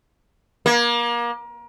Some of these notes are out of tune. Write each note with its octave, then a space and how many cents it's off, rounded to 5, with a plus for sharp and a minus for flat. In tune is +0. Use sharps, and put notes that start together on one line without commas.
A#3 +30